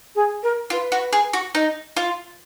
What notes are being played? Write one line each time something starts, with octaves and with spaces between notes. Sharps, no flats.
G#4
A#4
F4 B4
F#4
G#4
F#4
D#4
F4